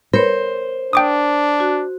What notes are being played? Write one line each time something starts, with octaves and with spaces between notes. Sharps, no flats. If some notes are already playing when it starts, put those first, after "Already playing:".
A#4 C5 C#5
D4 G5 D6 D#6
F#4